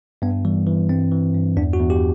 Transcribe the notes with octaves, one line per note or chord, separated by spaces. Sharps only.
G2 B3
E3 G3
E3
G2 C4
E3
G2
E2 D4
F#4
E2
G4